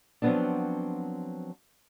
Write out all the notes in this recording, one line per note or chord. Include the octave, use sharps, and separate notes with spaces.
F3 F#3 A3 B3 C4 D4